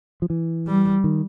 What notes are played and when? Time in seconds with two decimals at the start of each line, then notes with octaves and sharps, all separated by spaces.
0.22 F3
0.30 E3
0.67 G3
1.04 D#3